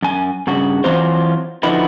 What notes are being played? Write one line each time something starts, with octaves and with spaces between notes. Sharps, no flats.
F#2 G#5
G2 C#3 F#4
E3 F#3 C4 F4 F#4 C5
D3 F3 D#4 E4 F#4 B4